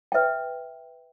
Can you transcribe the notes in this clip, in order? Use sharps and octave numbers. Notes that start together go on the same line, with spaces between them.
B4 E5 G5